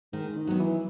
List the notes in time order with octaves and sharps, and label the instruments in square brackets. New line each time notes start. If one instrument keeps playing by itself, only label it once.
[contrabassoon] G#2 [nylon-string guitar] D#3
[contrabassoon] D#3
[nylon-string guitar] F#3 B3
[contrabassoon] E3